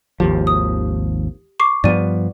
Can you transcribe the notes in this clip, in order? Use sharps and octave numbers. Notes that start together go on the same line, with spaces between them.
G#1 D#2 F3 G4
D#6
C#6 D6 C7
G2 F3 B3 D5 D#7